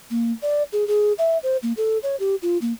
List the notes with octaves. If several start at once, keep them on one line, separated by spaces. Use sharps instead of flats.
A#3
D5
G#4
G#4
E5
C5
A#3
A4
C#5
G4
F4
A#3